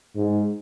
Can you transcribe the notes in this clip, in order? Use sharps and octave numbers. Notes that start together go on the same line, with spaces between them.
G#2